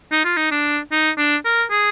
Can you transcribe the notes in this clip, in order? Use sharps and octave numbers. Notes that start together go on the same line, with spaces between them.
D#4
F4
D#4
D4
D#4
D4
A#4
G#4